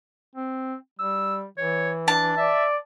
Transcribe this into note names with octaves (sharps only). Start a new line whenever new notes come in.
C4
G3 E6
E3 C#5
D4 A5
D5 E5